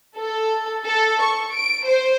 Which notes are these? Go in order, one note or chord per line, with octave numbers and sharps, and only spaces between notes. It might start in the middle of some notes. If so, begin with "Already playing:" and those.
A4
A4
C#6
D7
C5